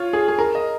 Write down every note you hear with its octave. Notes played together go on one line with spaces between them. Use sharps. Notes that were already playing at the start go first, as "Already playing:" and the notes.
Already playing: F4 C#5
G#4
G#4
A#4
D#5